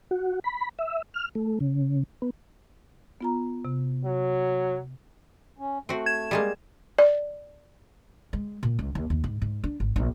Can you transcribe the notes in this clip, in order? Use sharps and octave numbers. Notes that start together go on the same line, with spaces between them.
F#4
B5
E5
F6
A3
C#3
B3
B3 F4 A#5
C3
F#3
C#4
A3 C4 F#4
G#6 E7
G3 G#3 A#3
D5
G#3
A#2
C#2
D#2
D#2
G#2
G#2
D4
G#1
A#1